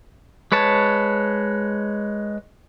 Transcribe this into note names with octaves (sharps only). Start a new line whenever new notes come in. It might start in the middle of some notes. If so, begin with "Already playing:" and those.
G#3 B4 C#5 A5